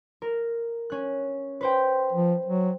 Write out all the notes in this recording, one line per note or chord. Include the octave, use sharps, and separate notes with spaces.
A#4
C#4 F#6
B4 C5 G5
F3
F#3